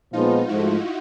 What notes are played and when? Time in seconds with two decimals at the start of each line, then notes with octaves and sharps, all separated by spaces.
0.13 A#2 F3 G#3 B3 D#4 F4
0.48 G#2 F3 A3 E4 F#4